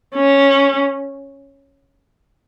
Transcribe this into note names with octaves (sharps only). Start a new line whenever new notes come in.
C#4